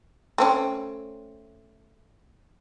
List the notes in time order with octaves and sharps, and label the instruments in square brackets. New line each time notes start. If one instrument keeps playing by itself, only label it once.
[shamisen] A3 C4 C#4